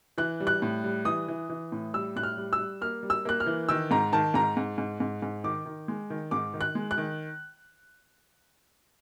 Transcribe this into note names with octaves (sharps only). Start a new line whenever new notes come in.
E3 F#6
G3
F#6
A2
G3
E3 D#6
E3
E3
A2
G3 E6
A2 F#6
F6
G3
E6
G3
A#3 F6
G3
E6
A#3 F#6
F6
E3
D#3 E6
G#2 A#5
D#3 A5
G#2 A#5
G#2
G#2
G#2
G#2
D#3 D6
D#3
G#3
D#3
G#2 D6
D#3
F#6
G#3
F#6
D#3